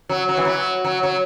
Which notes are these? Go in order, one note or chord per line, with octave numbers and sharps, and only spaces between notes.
F#3
F#3
E3
F#3
F#3
F#3